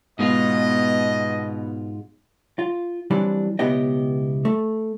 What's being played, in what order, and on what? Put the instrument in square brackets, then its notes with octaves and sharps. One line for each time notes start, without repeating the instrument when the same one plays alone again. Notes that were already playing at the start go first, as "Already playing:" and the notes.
[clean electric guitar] G#2 G#3 F4 [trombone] B2 [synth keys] B3 B4 [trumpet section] D#5
[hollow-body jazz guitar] F4
E3 F#3 G3 C4 D4
C#2 B2 B3 E4 G4 D#5
A3